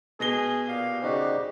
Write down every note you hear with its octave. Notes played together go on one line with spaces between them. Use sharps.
B2 G#4 A#6 G7
A#2 G4 F5
C#3 D#4 F#4 G4 C5 D5